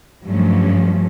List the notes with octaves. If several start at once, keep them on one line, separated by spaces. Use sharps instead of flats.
G2 F3 F#3 A3 C#4